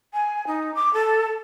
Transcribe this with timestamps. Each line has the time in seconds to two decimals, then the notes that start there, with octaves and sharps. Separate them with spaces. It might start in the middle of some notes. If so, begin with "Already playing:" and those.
0.13 G#5
0.47 D#4
0.74 D6
0.93 A4